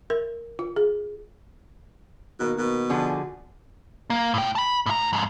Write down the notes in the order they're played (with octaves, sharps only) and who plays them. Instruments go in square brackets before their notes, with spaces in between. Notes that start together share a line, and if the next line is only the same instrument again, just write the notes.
[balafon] A#4
F4
G#4
[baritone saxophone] B2 [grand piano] D#3 A#3 B3 [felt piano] F#4 A#4
[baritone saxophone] B2 [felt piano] A#4
[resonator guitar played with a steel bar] D3 F3 G#4 [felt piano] F#5 A5
[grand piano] F#4 G#5
[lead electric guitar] A#3
A2 G5
A5 B5
A2 A#5
F2 G#2